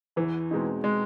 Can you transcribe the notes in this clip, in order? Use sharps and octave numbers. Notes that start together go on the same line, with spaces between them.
E2 E3
B2 G#3 C4 D#4
G#3